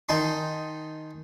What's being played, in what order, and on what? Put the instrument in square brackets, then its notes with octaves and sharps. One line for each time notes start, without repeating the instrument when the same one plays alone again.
[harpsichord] D#3 D#4 G#5 A5 C6